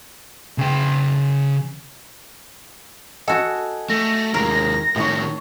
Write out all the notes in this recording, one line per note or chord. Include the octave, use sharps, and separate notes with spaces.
C#3 G5
F#4 A4 D#5 F#5 G#5
A3 A#6
D#2 G#3 A#4
A2 D#3 C#5 A5 D#6